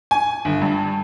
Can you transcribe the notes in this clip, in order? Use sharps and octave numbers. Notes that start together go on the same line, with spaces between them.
G#5
G1
G2